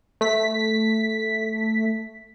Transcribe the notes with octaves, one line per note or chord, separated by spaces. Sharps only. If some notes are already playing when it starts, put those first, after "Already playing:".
A3 B6